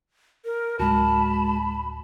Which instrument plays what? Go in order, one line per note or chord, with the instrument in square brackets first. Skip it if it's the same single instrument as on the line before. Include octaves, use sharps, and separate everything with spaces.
[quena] A#4
[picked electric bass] D1 [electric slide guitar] G#3 F#4 [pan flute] A5 [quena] B5